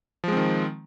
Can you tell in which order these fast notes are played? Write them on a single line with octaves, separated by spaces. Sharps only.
F3 G#3 C4 D#3